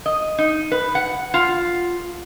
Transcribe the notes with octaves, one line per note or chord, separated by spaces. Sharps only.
D#5
D#4
B4
F#5
F4